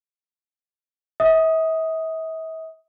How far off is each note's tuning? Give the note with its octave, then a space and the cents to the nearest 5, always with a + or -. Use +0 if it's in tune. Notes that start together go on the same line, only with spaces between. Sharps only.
E5 -40 D#6 +0